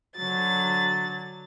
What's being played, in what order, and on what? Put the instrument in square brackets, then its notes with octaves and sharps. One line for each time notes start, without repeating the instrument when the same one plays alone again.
[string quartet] D3 F#3 A6